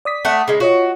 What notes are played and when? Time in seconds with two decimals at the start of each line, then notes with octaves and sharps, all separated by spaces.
0.05 D5 D#6 B6
0.25 A3 F#5
0.48 C#3 G#3
0.60 F4 F#4 C#5 D#5